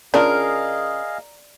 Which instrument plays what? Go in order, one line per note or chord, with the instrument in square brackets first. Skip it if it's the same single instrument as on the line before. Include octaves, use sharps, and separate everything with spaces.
[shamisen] C#3 D4 F4 [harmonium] G#4 D#5 F5 [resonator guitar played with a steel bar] A#4 [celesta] D5